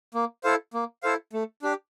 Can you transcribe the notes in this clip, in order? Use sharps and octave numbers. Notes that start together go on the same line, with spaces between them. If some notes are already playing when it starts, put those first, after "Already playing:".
A#3
E4 A4 C5 F5
A#3
E4 A4 C5 F5
A3
D4 G4